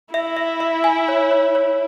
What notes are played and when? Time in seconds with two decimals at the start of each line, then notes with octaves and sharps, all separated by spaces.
0.14 E4 E5
0.37 E5
0.60 E5
0.84 G#5
1.08 C#5
1.31 C#5
1.55 C#5